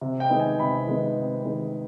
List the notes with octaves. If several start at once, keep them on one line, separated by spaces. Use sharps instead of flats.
C3
G5
D#3 G#3 B3 D#4
G#5
C3 B5
D#3 G#3 B3 D#4
C3
D#3 G#3 B3 D#4